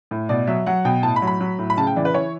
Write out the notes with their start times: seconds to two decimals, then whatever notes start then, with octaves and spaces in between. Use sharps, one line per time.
0.11 A2
0.29 B2 D5
0.47 F#3 E5
0.66 F#3 F#5
0.85 B2 G5
1.03 A2 A5
1.16 B5
1.22 F#3
1.27 B5
1.41 F#3
1.59 A2
1.70 B5
1.77 C#3 A5
1.87 G5
1.96 E3 D5
2.05 B4
2.14 E3 C#5